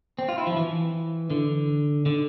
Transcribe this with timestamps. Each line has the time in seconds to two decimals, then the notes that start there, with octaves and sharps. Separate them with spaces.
0.19 C4
0.29 F4
0.38 E4
0.47 F3
0.57 E3
1.30 D3
2.06 D3